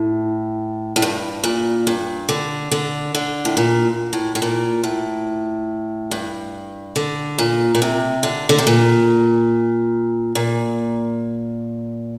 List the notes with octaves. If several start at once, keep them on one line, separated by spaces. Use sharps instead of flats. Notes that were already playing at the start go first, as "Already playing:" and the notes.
Already playing: A2
A2
G2
A#2
G2
D3
D3
D3
A2
A#2
A2
A2
A#2
A2
G2
D3
A#2
A#2
C3
D3
D3
C3
A#2
A#2